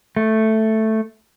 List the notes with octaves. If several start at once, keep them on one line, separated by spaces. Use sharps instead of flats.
A3